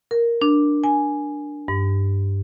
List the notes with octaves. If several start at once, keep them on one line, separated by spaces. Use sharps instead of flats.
A#4
D4
G#5
G2